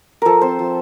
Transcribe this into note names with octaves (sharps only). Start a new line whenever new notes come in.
F3 A4 A#4
C4 C5
F3